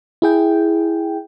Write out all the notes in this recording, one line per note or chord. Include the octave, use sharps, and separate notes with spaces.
E4 G#4 G5